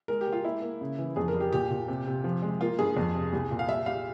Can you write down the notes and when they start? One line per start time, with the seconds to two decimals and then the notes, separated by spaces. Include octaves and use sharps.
0.08 G#3 A#4
0.21 G4
0.27 G#3
0.33 F4
0.45 A#3 E4
0.62 A#3
0.81 C#3
0.99 E3
1.16 F2 G#4
1.28 A#4
1.34 G3
1.40 G4
1.53 A#2 G4
1.70 A#2
1.88 C3
2.07 C3
2.24 F3
2.42 G#3
2.61 A#3 F4
2.79 G2 G#4
2.97 F2
3.15 C3
3.33 C2
3.51 A#2
3.59 F5
3.69 G3 E5
3.86 G3 F5